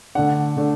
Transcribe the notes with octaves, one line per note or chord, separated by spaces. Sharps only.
D3 A3 D4 F#5
D3 A3 D4